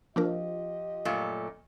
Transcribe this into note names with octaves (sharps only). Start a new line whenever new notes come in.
F3 A#3 D4 F4 G4 A#4 D#5
F#2 A#2 A3